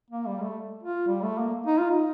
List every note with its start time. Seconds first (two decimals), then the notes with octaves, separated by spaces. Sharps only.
0.11 A#3
0.27 G3
0.43 A3
0.83 F4
1.07 G3
1.23 A3
1.38 A#3
1.67 D#4
1.79 F4
1.91 D#4